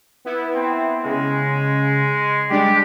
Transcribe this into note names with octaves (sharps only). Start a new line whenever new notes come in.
B3 E4
C4
C#3 G#3
G3 G#3 D4 G4